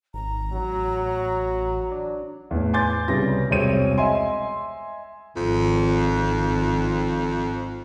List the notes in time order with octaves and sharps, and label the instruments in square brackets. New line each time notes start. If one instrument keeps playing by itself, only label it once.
[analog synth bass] G#1 [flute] A#5
[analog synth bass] A1 [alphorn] F#3
[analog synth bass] D4
[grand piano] E2 A2
G#5 C6 D6 G6 A6
C2 C#3 G3 B3 C#4 A#6
E1 C2 C4 G#4 C#5 D#7
D#5 E5 G#5 C6
[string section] G#1 [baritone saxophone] F2